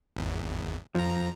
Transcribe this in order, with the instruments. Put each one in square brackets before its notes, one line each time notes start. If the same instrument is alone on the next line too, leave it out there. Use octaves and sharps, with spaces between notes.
[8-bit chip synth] G#1 E2
[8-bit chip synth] F2 A#5 [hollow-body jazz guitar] F3